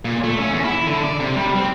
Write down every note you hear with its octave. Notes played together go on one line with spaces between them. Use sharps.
A#2
A3
C#4
E2
E4
D3
D5
C3
G3
C4